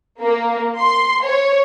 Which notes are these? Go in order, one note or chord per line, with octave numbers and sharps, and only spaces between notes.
A#3
C6
C#5